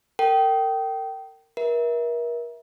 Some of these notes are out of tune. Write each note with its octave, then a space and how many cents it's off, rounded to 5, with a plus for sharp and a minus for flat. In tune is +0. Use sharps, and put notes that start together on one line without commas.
A#4 -35 G5 -20
A#4 +35 E5 -10